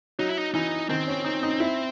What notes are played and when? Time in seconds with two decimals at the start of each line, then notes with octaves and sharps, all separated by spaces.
0.19 F#3 D#4
0.28 E4
0.38 D#4
0.54 E3 D#4
0.89 D#3 C4
1.08 C#4
1.24 D#4
1.43 D#4
1.60 E4